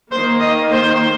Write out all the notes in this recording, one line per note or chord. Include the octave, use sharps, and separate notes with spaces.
D#3 A#3 C5
D#5
C5